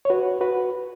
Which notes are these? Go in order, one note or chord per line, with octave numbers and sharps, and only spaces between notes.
C#5
F#4 B4
F#4 B4